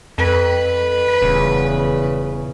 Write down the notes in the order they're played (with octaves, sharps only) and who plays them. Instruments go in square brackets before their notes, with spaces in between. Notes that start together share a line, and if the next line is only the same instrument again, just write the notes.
[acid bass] F2 [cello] B4
[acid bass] D#1 [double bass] E2 C#3